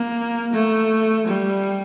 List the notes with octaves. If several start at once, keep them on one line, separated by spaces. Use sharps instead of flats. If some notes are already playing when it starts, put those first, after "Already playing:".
Already playing: A#3
A3
G3